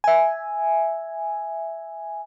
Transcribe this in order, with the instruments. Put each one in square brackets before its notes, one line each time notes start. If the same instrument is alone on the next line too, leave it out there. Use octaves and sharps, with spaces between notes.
[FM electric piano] E5 G#5